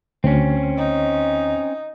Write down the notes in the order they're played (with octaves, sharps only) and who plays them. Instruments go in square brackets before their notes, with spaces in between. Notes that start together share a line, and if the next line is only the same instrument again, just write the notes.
[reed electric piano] D2 [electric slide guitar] C4 C#4
[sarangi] D#4